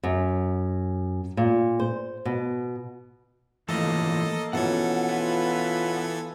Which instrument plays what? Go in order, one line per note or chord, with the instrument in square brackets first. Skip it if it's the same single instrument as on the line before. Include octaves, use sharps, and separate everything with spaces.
[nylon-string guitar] F#2
A#2
C5
B2
[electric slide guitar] E3 F3 A3 [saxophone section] A#3 [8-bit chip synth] A4 D#5
[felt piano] B2 F3 C#4 [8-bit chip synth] E3 A4 G#6 [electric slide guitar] F#5
[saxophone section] B3 F4